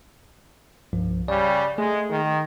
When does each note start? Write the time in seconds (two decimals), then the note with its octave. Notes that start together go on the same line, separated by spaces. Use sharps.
0.93 C2 G2 F3
1.28 C#3 G3 D5
1.78 G#3 A3 G#4
2.10 D#3